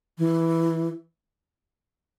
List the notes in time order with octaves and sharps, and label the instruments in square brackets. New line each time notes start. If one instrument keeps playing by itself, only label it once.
[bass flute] E3